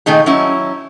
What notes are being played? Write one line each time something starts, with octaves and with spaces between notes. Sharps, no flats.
A#2 D#3 A3 D#4 G#4
F#3 C#4 E4